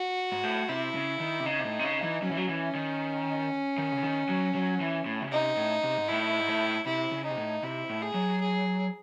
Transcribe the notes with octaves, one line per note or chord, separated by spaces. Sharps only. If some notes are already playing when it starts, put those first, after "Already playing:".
Already playing: F#4
G#2
A2
C3 E4
C#3
D#3
C3
C#3 D#4
C3
A2
C3
C#3
E3
F#3 C#4
E3
F#3
E3
D#3
D#3
C#3
D#3
F#3
F#3
E3
A2
C#3
C3 D#4
A2
C3
G#2
A2 E4
G#2
A2
C3 E4
C#3
D#4
C3
A2
C3 E4
A2
G#4
F#3
G#4